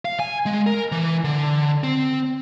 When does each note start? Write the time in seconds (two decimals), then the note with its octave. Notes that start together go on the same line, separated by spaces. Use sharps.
0.05 F5
0.20 G#5
0.46 G#3
0.67 A#4
0.92 E3
1.24 D3
1.84 C4